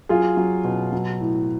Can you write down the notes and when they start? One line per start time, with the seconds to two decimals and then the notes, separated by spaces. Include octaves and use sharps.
0.09 F#3 F4 G#4
0.37 F#3
0.64 B2
0.92 F#3
1.21 A2